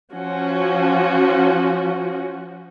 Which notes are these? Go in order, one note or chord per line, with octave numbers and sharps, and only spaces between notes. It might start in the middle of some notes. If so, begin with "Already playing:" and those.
F3 C#4 F#4